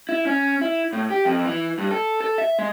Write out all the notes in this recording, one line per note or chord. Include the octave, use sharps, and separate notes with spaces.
E4
C#4
E4
A2
G4
F2
E3
G2
A4
A4
E5
G#3